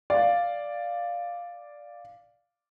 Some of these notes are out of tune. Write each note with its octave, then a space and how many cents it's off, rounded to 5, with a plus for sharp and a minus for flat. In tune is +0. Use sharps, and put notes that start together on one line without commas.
D5 +0 F5 +0